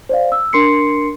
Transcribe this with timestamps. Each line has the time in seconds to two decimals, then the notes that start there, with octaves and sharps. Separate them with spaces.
0.09 C5 D5 F5
0.32 E6
0.53 D4 A#4 C6 C7 C#7